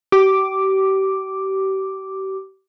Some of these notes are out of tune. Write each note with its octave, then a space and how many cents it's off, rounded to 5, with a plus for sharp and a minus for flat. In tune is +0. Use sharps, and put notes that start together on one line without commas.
G4 -35 D6 +0